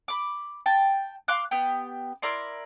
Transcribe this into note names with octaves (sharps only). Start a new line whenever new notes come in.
B5 D6
G5 A5
F5 C6 D6 F#6
B3 G4 G5
E4 A#4 D5 C6